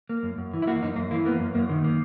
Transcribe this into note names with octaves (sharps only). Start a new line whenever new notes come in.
A#3
F#2
F#2
E3
E4
A#3 F#4
F#2 D#4
F#2 A#3
E3 A#3
A#3 B3
F#2
F#2 A#3
D#3
A#3